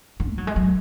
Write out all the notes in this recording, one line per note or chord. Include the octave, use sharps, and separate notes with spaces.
D4
G#3
F#3
G#3
F#3